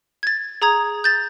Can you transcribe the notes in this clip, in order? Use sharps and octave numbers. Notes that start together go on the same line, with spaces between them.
G#6 A6
G#4 A#5 D#6 G#6
G6 A6